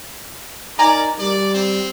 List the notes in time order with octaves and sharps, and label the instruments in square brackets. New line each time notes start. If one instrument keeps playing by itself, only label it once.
[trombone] D#4 [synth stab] A#4 G#5 A#5 [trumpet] D5
[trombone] G3 [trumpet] D5
[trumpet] C4